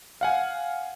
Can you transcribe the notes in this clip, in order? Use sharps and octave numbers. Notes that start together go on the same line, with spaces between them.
F5 F#5 G#5